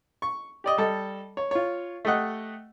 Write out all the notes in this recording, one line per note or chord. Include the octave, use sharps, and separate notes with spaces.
C#6
G4 D5 D#5
G3 A4 D#5
C#5
F4 C#5
A3 G4 D#5 F#5